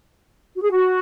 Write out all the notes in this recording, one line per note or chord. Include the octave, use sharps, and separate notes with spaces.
F#4
G#4
F#4